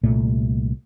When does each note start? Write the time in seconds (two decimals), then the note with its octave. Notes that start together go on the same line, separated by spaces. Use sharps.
0.03 C2 A#2 A3